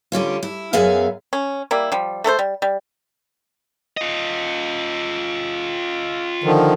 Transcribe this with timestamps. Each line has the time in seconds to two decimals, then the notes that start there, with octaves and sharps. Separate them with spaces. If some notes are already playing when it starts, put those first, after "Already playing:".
0.12 D3 G3 C#4 F4
0.43 E4
0.73 F#2 B3 G#4 E5 F5
1.33 C#4
1.71 G3 A#3 E4
1.92 F3 G3
2.24 A3 A4 A#4 C5
2.39 G3
2.62 G3
3.97 F4 D#5
6.44 D3 D#3 F3